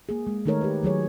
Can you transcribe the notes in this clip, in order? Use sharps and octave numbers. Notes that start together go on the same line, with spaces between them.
A#3 G#4
G#3
D#3 A3 D#4 A4 A#4 C#5
G4 B4
D#3 F#3 G#4 C#5